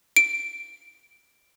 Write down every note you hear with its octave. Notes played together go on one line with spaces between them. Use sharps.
D7